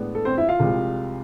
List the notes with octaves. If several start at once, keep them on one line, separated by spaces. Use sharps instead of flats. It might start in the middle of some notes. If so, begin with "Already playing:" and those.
Already playing: A2 G#3 B3 D4
A4
C4 C5
E4 E5
F4 F5
C2 C3 F3 G#3